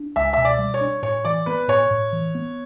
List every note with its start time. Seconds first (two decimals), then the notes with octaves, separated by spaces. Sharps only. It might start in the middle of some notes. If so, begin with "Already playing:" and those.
Already playing: D4
0.16 C#2 E5
0.33 B2 E5
0.45 D5
0.59 G3
0.74 C#5
0.81 D4
1.02 A2 C#5
1.25 E3 D5
1.46 B3 B4
1.68 A2 C#5
1.91 A2
2.13 E3
2.35 B3